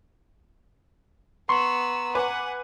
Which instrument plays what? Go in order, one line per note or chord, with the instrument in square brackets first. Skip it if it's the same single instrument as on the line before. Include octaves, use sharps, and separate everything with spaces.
[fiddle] B3 E6 [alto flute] A#5 [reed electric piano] C6 C#6
[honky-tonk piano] B4 G#5 D6 [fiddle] F#5